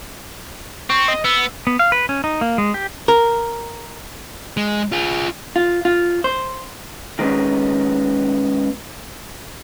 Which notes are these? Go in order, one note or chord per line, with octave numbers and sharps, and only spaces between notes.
C4 C#6
D#5
B3 E6
B3
F5
B4
C#4
D#4
A#3
G#3
G4
A#4
G#3
F4 G#4
F4
F4
C5
D#3 G#3 B3 C#4